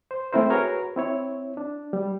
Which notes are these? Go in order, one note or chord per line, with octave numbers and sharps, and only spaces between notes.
C5
A3 C4 C#4 E4 A#4 C5
F#4 G#4 A#4 B4 C#5
C4 E4 C#5
D4
G3